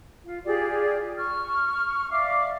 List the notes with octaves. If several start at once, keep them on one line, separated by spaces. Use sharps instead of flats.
F4
F4 G4 G#4 D5
C#6 F6
D5 E5 F5 D6